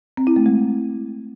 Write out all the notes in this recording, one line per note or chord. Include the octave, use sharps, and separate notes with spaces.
C4
E4
A3
G#3